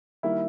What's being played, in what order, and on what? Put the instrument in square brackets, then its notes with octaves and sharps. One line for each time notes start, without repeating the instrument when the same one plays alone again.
[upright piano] D#3 G3 A#3 [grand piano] E4